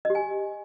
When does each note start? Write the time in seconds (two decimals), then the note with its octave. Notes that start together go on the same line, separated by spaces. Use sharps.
0.05 D#5
0.10 G4
0.15 G#5